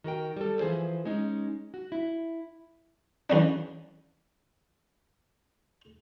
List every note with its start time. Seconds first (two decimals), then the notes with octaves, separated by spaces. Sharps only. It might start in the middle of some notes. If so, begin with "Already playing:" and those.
0.04 D#3 F#4 A#4 G5
0.37 G3 A4
0.60 E3 F3 G#4 C5
1.05 G#3 C#4 D#4
1.74 F#4
1.92 E4
3.30 E2 C#4 D4